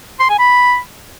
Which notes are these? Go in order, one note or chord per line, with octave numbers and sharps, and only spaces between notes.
C6
G#5
B5